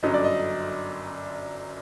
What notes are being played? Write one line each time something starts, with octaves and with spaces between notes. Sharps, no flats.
G1 F#2 D3 F#3 D#5
D5
D#5